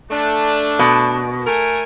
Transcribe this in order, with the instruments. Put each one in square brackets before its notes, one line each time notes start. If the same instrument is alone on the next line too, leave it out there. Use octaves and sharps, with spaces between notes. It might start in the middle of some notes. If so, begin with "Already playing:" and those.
[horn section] A3 D4
[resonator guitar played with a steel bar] B2
[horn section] A3 A#4 G#5